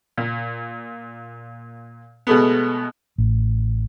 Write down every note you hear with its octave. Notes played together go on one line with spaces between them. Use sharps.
A#2
B2 G#3 A3 B3
A1